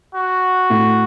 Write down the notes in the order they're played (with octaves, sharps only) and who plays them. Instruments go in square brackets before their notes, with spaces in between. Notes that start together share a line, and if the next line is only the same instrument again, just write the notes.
[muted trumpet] F#4
[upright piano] A2